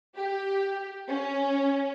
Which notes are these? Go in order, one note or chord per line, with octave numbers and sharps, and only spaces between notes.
G4
C#4